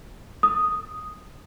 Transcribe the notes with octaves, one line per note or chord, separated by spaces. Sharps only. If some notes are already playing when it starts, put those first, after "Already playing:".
D#6